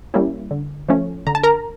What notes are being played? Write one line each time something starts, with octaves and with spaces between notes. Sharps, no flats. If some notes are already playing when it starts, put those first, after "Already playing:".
G3 A#3 C#4 E4
D3
F3 A3 C#4
D3 A#5
A5
A#4 A#5